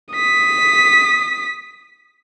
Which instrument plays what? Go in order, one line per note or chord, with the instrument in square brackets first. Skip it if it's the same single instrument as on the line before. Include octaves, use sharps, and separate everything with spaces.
[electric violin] D#6 B6